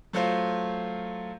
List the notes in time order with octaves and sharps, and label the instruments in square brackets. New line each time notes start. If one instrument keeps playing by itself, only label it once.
[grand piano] F#3 A3 F4 C5 F5